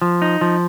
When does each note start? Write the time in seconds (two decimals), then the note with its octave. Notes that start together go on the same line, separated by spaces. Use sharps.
0.02 F3
0.22 D#4
0.41 F3